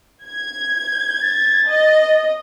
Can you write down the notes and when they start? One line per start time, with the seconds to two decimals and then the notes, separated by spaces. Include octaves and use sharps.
0.25 G#6
1.22 A6
1.67 D#5